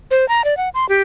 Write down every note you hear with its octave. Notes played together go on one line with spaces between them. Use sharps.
C5
A#5
D5
F#5
C6
G4